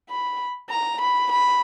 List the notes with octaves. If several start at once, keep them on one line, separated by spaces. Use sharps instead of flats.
B5
A#5
B5
B5